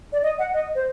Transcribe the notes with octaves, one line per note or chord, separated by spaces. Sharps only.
D5
D#5
F#5
D#5
C5